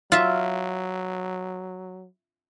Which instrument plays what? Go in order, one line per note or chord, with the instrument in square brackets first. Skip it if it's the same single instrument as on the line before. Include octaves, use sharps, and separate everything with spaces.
[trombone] F#3 [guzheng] F4 E5